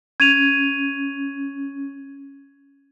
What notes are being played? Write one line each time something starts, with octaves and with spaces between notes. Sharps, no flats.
C#4 G#6 D#7 F7